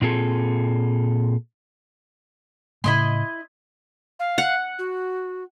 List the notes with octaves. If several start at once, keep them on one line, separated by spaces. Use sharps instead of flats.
A#2 C4 F4 G#4 A4
A2 C#3 A3 E4 D#5 C6
F5
F#5
F#4